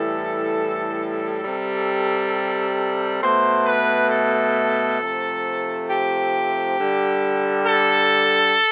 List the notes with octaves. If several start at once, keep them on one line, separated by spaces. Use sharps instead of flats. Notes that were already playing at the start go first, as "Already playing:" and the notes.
Already playing: A2 E3 G3 A4
C3 G3
B2 A3 C5
B4
A4
C3 F3 A3
G4
D3 G3
A4